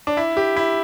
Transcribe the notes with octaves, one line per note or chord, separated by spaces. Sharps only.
D4
E4
G4
E4